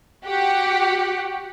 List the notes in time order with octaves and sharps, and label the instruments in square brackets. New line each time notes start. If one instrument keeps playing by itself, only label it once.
[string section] F#4 G4 F#5